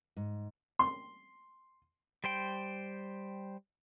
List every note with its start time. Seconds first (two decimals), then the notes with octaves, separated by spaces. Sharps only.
0.16 G#2
0.79 C6
2.24 G3 C5 G5